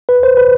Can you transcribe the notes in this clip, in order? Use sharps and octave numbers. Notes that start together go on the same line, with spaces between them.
B4
C5
B4